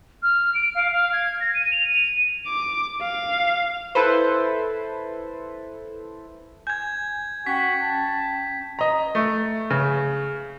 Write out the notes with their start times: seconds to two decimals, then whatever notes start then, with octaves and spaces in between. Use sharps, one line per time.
0.23 F6
0.54 D7
0.75 F5
0.92 F5
1.13 G#6
1.40 A#6
1.54 D#7
1.71 F7
1.89 D#7
2.47 D6
3.02 F5
3.95 E4 A4 B4 C5
6.67 G#5 G6 G#6
7.46 C#4 F#4 G5 B6
7.81 A5
8.79 D#5 A#5
9.15 A3
9.70 C#3